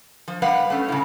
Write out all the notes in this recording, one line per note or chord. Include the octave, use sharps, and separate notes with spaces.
F3
G3 B4 F5 F#5
A3 C#4
A2 C#3